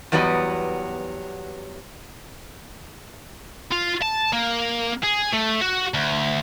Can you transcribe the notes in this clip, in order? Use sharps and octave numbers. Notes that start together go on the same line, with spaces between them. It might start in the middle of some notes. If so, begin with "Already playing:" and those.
E2 F#3 G3 B3 F#4 D#5
F4
A5
A#3
G#4
A3
F#4
D2